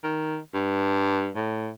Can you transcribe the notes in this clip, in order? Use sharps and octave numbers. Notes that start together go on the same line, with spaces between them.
D#3
G2
A2